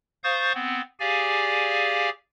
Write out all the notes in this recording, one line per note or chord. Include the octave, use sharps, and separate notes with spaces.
C5 F5 C#6 D#6 G6 A6
B3 C4
G4 G#4 D5 F5 G#5